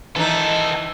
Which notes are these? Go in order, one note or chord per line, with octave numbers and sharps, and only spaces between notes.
D#3 E3 D#4 A4